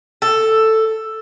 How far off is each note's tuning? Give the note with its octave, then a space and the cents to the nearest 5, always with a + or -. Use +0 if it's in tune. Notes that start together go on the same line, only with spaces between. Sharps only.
A4 +5